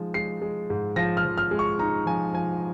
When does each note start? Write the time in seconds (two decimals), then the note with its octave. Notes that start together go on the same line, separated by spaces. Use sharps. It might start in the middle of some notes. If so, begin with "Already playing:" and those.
Already playing: F3 G#3 D#4
0.14 G#3 C7
0.42 G#3
0.70 G#2
0.96 F3 A#6
1.17 F6
1.25 F3
1.38 F6
1.51 G#3
1.59 C#6
1.79 D#4 A#5
2.06 F3 G#5
2.34 F3 G#5